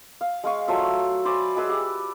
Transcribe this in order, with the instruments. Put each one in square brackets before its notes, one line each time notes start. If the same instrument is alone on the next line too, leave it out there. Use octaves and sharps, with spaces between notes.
[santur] F5
G#3 F5 C#6
F#3 A3 F4 E5
C5 D5 G#5 B5
G#3 G#4 B4 E6
G4